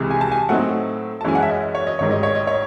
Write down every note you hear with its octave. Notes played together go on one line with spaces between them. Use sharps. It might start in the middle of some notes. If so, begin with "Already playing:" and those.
Already playing: C2 C3 E3 G#3
G#5
A5
G#5
A2 F#3 A3 C4 D#4 F#5
A5
F#2 E3 G#3 C#4 E4 G#5
F#5
E5
D#5
C#5
D#5
A1 G#2 D#3 C#5
D#5
C#5
D#5
C#5